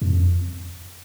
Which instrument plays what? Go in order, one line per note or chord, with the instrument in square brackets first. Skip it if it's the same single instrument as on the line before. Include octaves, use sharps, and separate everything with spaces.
[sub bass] F2